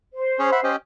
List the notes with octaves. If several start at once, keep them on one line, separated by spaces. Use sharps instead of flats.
C5
C#4 G#4 C#5
E5 F#5 B5
C#4 G4 D#5